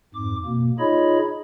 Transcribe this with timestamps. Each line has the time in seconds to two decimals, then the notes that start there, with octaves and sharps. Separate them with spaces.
0.14 F2 G#2 D6
0.46 B2 A#3
0.79 D#4 F4 G#4 C#5 D#5 B5